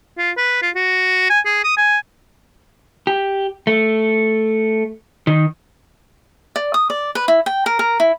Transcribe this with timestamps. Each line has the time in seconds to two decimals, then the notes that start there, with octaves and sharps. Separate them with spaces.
0.18 F4
0.37 B4
0.62 F4
0.75 F#4
1.30 G#5
1.45 G#4
1.64 D#6
1.77 G#5
3.07 G4
3.67 A3
5.27 D#3
6.56 D5
6.74 D#6
6.90 D5
7.15 B4
7.28 E4
7.46 G5
7.66 A#4
7.79 A#4
8.00 E4